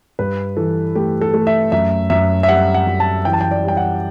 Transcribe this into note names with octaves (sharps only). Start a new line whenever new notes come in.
G2 B4
E3 A4
A3 G4
A4
A3
E5
F#2 E5
F#2 E5
E5
G3 F#5
F#5
F#2
A5
E3 G5
A5
G5
D5
G3 G5
F#5